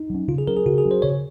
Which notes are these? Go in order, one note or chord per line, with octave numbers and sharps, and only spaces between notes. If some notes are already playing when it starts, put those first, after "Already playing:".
Already playing: D#4
F#3 C#4
C#3 F4
G#4
F#3 C#4 A#4
G#4
C#3 F#4
G#4
F#3 C#4
C5
C#3 C#5